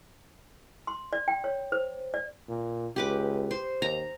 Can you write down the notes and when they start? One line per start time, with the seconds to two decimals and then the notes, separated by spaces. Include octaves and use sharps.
0.87 C6
1.13 D5
1.28 G5
1.44 C#5
1.72 C5
2.14 D5
2.48 A#2
2.96 C#2 G4 B4 D6
3.51 C5
3.82 D#2 A#5